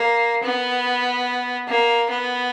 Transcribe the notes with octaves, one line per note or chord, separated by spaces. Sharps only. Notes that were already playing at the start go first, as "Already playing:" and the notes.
Already playing: A#3
B3
A#3
B3